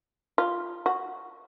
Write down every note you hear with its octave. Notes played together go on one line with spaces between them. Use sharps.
F4
F#4